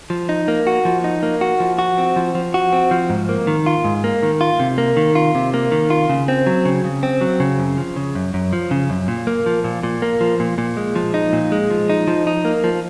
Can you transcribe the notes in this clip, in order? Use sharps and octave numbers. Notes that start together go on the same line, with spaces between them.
F3
D#4
A#3
F#4
F3
D#4
A#3
F#4
F3
F#4
C4
F3
F3
F#4
C4
F3
G#2
A#3
D#3
F4
G#2
A#3
D#3
F4
C3
A#3
D#3
F4
C3
A#3
D#3
F4
C#3
C4
F#3
C#3
C#3
C4
F#3
C#3
F#2
F3
C#3
F#2
F#2
F3
C#3
F#2
A#2
A#3
F3
A#2
A#2
A#3
F3
A#2
A#2
G#3
F3
D#4
A#2
G#3
F3
D#4
F3
D#4
A#3
F3